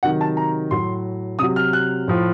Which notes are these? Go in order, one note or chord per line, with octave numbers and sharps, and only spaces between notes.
C3 D#3 F#3 F#5
A5
A#5
A2 F#3 C6
C3 F#3 D#6
F6
F#6
A2 F3